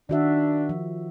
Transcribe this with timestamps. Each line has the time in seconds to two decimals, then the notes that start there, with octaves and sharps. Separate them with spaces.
0.09 D#3 D4 F#4 E5
0.69 F3